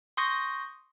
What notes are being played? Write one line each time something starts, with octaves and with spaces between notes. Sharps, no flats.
C6 C#6 D#6 G6 A#6